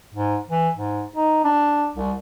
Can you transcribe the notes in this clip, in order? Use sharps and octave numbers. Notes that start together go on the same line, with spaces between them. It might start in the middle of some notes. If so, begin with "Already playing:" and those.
G#2
E3
G#2
D#4
D4
C2